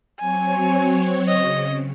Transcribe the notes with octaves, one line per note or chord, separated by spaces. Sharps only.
F#3 C4 C#5 G#5
C#3 D#5